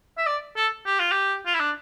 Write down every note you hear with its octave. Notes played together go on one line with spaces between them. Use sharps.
E5
D5
A4
G4
F4
G4
F4
E4
D4